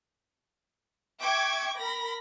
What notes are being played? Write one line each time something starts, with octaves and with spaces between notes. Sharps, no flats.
E5 G5 C#6 D6 G#6
A#4 B5 A#6